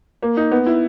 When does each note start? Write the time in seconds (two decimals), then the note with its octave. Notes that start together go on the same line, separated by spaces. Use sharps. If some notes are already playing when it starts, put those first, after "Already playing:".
0.22 A#3
0.37 D#4
0.52 B3
0.66 E4